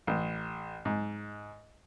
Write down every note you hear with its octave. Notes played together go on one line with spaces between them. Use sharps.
A1
G#2